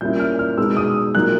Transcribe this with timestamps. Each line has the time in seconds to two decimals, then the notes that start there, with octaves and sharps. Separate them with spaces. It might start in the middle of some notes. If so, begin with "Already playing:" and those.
0.01 A#2 G3 A#3 C#4 E4 G6
0.20 F6
0.39 F6
0.58 B2 G#3 B3 D#4 E6
0.77 D#6
1.15 A#2 F#3 A#3 D#4 F#6